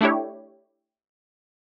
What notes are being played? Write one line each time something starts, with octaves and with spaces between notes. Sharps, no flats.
A3 D4 E4 G4 C#5